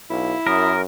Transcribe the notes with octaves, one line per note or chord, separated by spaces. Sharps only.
B1 E4 F5
F#2 A#4 D#6